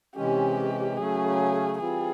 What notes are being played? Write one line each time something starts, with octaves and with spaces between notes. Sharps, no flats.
C3 E3 G#3 C#4 G4
C#3 F#3 A3 C#4 G#4
E3 G3 C4 F4 G#4